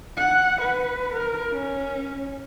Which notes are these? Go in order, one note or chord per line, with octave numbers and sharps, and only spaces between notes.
F#5
B4
A#4
C#4